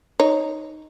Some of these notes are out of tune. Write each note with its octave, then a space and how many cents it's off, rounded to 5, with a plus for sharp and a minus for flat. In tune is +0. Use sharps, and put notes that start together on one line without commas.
D#4 +0 C#5 +0